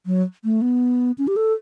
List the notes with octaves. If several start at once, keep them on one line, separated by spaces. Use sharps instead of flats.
F#3
A3
B3
C#4
G4
A4